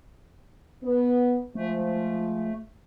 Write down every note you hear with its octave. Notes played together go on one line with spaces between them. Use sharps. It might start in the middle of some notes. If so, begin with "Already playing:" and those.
B3
F3 G#3 A3